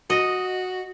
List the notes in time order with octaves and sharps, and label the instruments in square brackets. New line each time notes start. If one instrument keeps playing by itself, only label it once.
[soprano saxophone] F#4 [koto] D#5